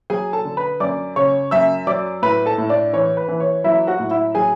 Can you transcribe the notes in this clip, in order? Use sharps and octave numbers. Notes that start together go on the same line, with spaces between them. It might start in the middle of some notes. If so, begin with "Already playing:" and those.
F#3 G#4 G#5
A4 A5
D3
B4 B5
F#2 D5 D6
C#3 C#5 C#6
F#2 E5 E6
F#3 D5 D6
A2 B4 B5
A4 A5
A2
D4 D5
E3 C#5
B4
E3
C#5
F#3 E4 E5
F#4 F#5
A2
E4 E5
F#3 G#4 G#5